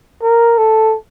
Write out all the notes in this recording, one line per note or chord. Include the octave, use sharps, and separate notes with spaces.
A#4
A4